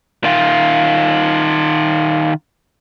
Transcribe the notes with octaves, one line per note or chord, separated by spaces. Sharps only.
D#3 F4